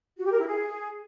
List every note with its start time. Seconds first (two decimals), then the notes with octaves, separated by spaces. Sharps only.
0.17 F#4
0.24 G4
0.31 A#4
0.38 E4
0.46 G#4